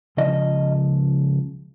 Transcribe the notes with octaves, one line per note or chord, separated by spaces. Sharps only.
C#2 C#3 F3 D#5